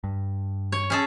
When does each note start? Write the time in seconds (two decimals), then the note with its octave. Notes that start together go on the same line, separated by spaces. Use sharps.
0.04 G2
0.72 C#5
0.90 C#4 G#4 A4